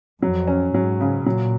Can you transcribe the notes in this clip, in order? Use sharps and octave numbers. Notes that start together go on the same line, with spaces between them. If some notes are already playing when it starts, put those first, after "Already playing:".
F2 F#3
C#4
G#2 F#3
C#3
A#2 F#3